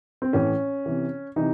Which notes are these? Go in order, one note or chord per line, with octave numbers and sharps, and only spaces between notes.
C4
A2 E3 C#4
C3 E3
C3 E3 D#4